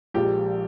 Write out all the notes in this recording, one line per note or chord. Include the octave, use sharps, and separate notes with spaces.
A#1 A#2 F3 G#3 G4